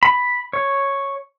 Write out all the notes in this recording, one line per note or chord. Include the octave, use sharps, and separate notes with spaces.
B5
C#5